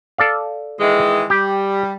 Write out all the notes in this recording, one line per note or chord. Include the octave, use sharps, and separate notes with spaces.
A4 D5 F5
D#3 E3 G#3
G3 G4